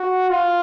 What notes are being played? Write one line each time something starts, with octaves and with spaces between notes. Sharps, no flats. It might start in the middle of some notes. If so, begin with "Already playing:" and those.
Already playing: F#4
F4